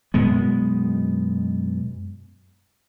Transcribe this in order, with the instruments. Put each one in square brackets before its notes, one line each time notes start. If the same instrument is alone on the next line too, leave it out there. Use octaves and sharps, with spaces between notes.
[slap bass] F#2 B2 G#3 B3